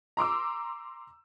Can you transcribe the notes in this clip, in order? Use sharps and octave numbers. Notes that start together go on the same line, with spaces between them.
A#5 C6 D6 E6